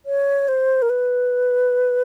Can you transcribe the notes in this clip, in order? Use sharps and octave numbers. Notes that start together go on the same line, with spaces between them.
C#5
C5
A#4
B4